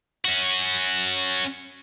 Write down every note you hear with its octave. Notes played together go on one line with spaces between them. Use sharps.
C#4 F#4